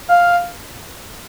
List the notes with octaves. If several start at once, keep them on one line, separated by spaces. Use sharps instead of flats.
F5